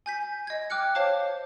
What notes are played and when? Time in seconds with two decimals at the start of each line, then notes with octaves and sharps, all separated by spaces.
0.06 G#5 G6 B6
0.47 D#5 G#6
0.70 G5 D6 F6 F#6 C#7
0.95 C5 C#5 F5 A5 D6